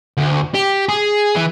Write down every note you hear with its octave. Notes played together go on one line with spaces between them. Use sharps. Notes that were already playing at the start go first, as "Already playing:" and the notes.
D2
G4
G#4
E3